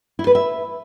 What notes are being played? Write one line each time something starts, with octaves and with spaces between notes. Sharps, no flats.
E4
B4
E5